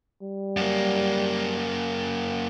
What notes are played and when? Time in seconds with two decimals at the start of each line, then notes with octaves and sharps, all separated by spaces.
0.22 G3
0.57 F#2 A#3